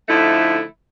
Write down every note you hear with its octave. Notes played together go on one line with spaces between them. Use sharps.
D3 F3 A3 D#4 E4